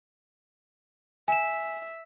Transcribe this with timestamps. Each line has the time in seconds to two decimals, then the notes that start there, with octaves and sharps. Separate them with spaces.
1.28 E5 G#5 E7